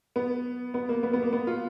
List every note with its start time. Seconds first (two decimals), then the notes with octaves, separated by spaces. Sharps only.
0.16 B3
0.74 B3
0.89 A#3
1.03 B3
1.13 B3
1.22 A#3
1.33 B3
1.47 F4